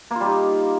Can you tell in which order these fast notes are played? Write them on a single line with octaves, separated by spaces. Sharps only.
A#3 F4 G3 D#4